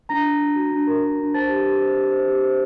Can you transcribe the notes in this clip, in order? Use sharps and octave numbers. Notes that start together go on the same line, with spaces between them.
D4 A#5 A#6
D4
D4
F#4
D4
A#4
A#4
D4
C5 A5 A6
G4
G4
C5
G4
C5
G4
C5